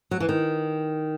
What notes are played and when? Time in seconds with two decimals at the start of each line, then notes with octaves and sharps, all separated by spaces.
0.11 F#3
0.20 E3
0.29 D#3